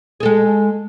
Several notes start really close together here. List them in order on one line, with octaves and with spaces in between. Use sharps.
G#4 A4 G#3